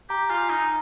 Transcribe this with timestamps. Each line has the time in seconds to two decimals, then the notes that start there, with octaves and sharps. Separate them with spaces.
0.09 G4 A#5
0.30 F4 G#5
0.49 D#4 A#5